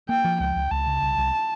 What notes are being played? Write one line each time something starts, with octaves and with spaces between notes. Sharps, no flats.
A#3 G5
F3
C#2 G5
C#2
C#2 A5
C#3
C2
C2